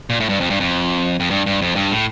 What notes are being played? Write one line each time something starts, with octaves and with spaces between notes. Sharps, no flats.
A#2
A2
G2
F2
G2
F2
F2
G2
G2
F2
G2
A2